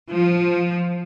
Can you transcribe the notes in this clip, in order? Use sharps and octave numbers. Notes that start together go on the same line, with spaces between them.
F3